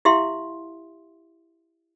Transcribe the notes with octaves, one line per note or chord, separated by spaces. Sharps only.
E4 G4 E5 F5 C6